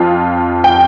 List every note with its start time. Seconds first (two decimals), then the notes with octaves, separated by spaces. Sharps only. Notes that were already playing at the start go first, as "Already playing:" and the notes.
Already playing: F2 F4
0.64 G5